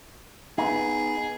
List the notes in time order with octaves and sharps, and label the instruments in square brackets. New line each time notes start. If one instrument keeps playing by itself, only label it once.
[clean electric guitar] B3 D#4 [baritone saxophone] G#4